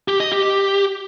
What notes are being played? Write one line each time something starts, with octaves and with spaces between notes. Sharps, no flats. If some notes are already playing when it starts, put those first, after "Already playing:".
G4
D#5
G4